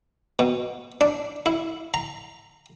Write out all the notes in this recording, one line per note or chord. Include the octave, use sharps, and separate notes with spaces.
B2
D4
E4
A#5